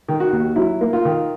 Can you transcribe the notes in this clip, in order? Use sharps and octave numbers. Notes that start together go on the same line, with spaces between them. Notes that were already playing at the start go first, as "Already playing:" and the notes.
D#3
F#4
D#2
F#3 E4
A#3
F4
D#3